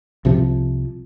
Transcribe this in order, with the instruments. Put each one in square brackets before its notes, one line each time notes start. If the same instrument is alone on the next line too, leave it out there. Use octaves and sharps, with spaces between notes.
[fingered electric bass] C2 C3 F3